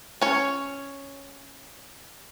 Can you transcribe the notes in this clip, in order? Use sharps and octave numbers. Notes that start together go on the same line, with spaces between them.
C#4 C#5